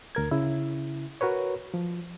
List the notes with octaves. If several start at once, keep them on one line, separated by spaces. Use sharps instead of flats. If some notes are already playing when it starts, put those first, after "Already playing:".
D2 A#4 G#6
C#3 E4
F#4 A#4 B4 C#5
F3